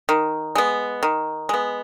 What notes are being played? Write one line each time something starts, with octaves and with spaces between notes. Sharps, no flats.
D#3
G#3 B3
D#3
G#3 B3